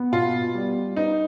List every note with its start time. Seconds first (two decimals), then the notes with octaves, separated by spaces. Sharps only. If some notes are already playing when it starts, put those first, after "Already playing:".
Already playing: B3
0.12 B2 F4
0.33 B3
0.55 G3
0.75 F4
0.96 D#4 B4